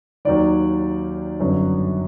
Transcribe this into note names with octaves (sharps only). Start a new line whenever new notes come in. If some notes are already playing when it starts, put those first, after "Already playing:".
D#2 D#3 F#3 D5
G1 F#2 D3 F#3